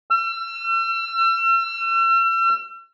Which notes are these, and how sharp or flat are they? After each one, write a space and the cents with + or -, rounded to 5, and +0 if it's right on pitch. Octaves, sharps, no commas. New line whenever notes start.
E6 +40